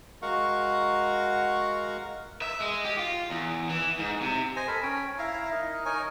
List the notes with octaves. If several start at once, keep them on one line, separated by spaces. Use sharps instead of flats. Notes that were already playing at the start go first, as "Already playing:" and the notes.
G#3 F#4 A#4 F5 F#5 C#6
E5
G#3
G4
F4
E2
E3
G#2
C3
C5 D#5 G#5
A4 A#4 B5
C#4 C#5 G5
E4 E5 F5 A#5
D#4 A#4
D#4 A#4 C#5 G#5